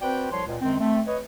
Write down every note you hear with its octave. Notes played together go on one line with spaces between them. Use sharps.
C4 F#4 B4 C5 D5 G5
C2 F3 C#5 C6
C#2 A#2
F#2 D#3 G#3 C4
A3 C4
B4 C#5 D#5